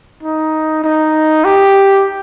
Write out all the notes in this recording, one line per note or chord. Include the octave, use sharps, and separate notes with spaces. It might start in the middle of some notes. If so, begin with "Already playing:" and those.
D#4
D#4
G4